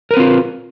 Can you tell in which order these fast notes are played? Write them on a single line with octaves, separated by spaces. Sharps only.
A#4 B4 C4 F4